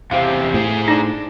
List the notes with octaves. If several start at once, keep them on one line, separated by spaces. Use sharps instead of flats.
E2 C3 C4 F5
A2 G#4 C5
D4 D#4